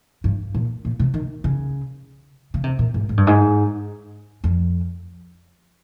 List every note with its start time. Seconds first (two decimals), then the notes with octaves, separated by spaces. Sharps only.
0.24 G2
0.55 A#2
0.85 A#2
0.99 C3
1.14 D#3
1.44 C#3
2.54 C#3
2.64 C3
2.79 A#2
2.94 G#2
3.09 G#2
3.17 G2
3.27 G#2
4.44 F2